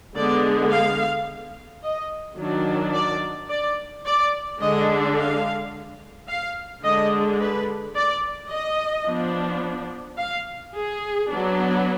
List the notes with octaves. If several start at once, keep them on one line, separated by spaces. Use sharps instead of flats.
D3 G#3 B3 D5
F5
D#5
D#3 F#3 D4
D5
D5
D5
D3 G#3 D4 D#5
F5
F5
D3 G#3 D4 D#5
B4
D5
D#5
F3 B3 D4
F5
G#4
F#3 B3 D4